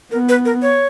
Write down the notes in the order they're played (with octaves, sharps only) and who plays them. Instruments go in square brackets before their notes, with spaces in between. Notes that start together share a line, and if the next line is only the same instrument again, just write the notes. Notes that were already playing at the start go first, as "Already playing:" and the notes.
[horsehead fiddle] B3 [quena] A#4
[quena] B4
A#4
C#5